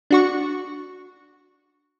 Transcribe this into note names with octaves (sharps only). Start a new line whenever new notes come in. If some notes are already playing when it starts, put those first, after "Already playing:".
D4 F#4 C#6